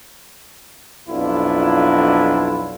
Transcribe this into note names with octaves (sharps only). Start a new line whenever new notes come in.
B1 F2 D4 E4 F4